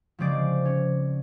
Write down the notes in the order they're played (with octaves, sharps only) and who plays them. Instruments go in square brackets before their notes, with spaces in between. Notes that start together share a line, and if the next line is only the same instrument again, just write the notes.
[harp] C#3 F3 G#3 C4 D5
C#4